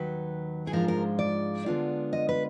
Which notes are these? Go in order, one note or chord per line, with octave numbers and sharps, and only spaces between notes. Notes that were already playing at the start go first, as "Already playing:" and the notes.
Already playing: D#2 D#3 F#3 B4
G#4
G#2 F3 G#3 D4 F4 A#4
A#4
D5
D3 G#3 B3 D4 F4
D#5
B4